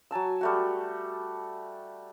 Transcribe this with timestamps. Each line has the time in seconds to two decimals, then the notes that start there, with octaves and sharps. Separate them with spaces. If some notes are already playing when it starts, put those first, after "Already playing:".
0.11 F#3 G#5 A5 E6
0.41 G3 A3 F#4